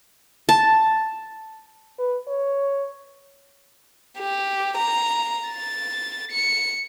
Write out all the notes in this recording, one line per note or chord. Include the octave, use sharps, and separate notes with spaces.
A5
B4
C#5
G4
A#5
A6
C#7